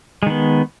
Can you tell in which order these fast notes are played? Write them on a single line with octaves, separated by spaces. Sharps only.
G#3 D#3 B3